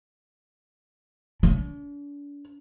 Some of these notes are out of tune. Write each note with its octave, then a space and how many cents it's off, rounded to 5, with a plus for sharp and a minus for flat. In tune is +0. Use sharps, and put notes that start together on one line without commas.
D4 -40